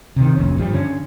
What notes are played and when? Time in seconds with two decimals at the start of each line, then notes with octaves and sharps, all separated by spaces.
0.16 C3 D#3
0.35 F1 A#1 C#4
0.56 G2 F3 G3
0.73 D3 C#4